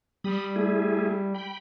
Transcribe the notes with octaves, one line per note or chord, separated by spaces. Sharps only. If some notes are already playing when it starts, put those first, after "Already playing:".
G3 B5 D#6
A3 E4 G#4
G5 B5